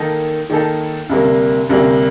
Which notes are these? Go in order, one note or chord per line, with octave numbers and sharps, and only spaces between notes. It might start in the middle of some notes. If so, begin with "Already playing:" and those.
Already playing: D#3 A#3 D#4 A4
D#3 A#3 D#4 A4
D2 C3 G3 A#3
D2 C3 G3 A#3